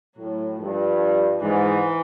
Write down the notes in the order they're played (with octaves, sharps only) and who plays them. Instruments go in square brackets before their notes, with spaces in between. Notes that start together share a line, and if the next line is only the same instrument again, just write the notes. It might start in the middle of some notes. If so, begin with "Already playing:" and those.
[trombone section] A2 [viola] F#3
[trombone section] G2 [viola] F3
[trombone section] G#2 [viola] E3